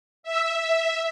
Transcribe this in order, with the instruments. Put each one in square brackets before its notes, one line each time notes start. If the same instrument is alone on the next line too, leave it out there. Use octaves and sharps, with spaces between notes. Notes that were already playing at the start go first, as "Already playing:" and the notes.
[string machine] E5